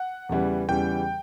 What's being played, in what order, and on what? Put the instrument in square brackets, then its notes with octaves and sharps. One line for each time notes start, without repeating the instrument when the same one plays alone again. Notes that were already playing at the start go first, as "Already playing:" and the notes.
Already playing: [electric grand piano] F#5
[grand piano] E2 C#3 E3 G3
[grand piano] E2 C#3 E3 G3 [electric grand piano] G5